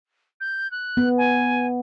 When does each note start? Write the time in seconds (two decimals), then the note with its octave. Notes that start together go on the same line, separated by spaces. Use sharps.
0.40 G6
0.71 F#6
0.97 B3
1.17 G#5